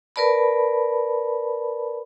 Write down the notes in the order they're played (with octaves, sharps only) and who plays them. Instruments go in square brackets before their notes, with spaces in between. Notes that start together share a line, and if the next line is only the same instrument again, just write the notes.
[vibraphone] A#4 B4 D5 A5 B5